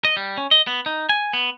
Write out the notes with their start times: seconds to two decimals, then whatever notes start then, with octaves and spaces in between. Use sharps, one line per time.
0.05 D#5
0.17 G3
0.38 C#4
0.51 D#5
0.67 B3
0.86 D#4
1.09 G#5
1.33 B3